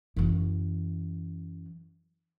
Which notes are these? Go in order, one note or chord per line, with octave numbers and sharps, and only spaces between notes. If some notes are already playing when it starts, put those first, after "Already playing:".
F#2 E3